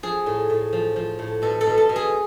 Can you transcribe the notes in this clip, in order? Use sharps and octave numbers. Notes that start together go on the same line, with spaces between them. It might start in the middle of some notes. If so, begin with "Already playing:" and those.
F3 G#4
A2
A2
F3
F3
A2
B2 A4
A4
B2
A4
B2
G#4